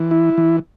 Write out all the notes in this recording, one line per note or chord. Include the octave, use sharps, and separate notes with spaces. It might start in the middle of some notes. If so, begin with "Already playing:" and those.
Already playing: E3
E4
E3